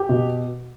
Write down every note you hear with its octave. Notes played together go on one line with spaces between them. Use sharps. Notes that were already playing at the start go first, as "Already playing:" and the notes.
Already playing: G4
B2